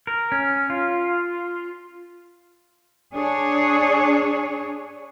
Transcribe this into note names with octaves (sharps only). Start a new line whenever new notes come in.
A#4
C#4
F4
D4 G#4 C#5